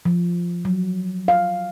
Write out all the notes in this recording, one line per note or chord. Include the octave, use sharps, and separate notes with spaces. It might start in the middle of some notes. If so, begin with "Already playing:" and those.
F3
F#3
F5